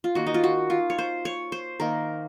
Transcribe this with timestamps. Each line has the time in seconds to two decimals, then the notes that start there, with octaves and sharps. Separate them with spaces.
0.04 F4
0.15 D#3 A#3 F#4
0.27 D#4
0.34 F4
0.44 F#4
0.70 F4
0.90 C#5
0.98 C5
1.25 C#5
1.52 C5
1.80 D#3 A#3 A#4